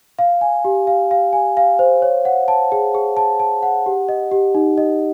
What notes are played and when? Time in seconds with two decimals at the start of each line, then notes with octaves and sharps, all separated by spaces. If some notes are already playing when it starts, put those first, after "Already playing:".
0.19 F5
0.41 G#5
0.65 G4
0.87 F5
1.11 F5
1.33 G#5
1.57 F5
1.79 C5
2.02 C#5
2.25 F#5
2.48 A5
2.72 G#4
2.95 G#4
3.17 A5
3.40 A5
3.63 F#5
3.86 G4
4.09 D#5
4.32 G4
4.55 D#4
4.77 D#5